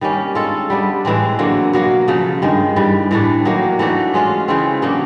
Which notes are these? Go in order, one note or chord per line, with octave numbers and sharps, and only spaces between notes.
D#3 G3 A#3 C#4
G#3 C#4 F4 A4
G3 B3 D4
A2 E3 G#3 C4
D3 F#3 A#3
B2 F#3 A#3
C#3 F3 A3
G2 D#3 G#3
G2 E3 G3
A2 E3 A3 D4
D#3 F#3 A#3
E3 A3 D4 F#4
G#3 C#4 F4
C#3 E3 A3 C4
C#3 F#3 A#3 D4